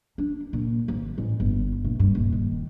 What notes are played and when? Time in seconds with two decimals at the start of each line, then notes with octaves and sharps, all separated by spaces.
0.18 D4
0.53 A#2
0.88 G#1
1.18 A1
1.40 G1
1.84 A#1
2.00 G2
2.15 D#1
2.32 D#3